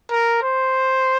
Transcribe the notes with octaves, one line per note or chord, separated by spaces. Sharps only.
A#4
C5